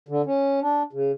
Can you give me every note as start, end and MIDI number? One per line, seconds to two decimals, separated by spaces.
0.08 0.22 50
0.26 0.60 61
0.62 0.83 62
0.93 1.12 49